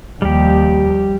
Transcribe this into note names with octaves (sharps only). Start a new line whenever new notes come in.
D#2 F3 G3 G4